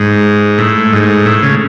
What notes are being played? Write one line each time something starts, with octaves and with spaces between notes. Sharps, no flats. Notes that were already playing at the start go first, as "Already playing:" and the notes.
Already playing: G#2
A2
G#2
A2
C#3